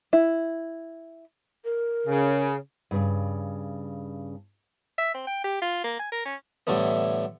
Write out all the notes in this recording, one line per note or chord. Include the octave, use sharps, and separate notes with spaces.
E4
A#4
C#3
G2 C#3
E5
C4
G5
G4
F4
A#3
G#5
A#4
C#4
A2 D3 E3 G3 A3 B3